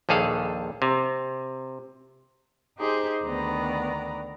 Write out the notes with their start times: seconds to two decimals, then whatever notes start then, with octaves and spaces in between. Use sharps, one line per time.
0.09 A#1 D#2 G#4 A4 F5
0.82 C3
2.78 D#4 G4 G#4 C5
3.26 D2 D#3 B3 D5 A#5